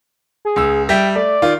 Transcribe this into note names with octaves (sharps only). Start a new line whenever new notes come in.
G#4
C#2 E6
G3 E5 G5
A3 D5
D#3 F4